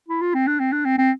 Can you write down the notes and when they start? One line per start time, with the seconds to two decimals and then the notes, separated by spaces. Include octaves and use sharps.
0.08 E4
0.21 F4
0.34 C4
0.47 D4
0.60 C4
0.72 D4
0.85 C4
0.98 C4